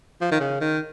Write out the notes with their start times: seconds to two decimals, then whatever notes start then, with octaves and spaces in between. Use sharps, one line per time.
0.21 F3
0.31 D#3
0.40 C#3
0.61 D#3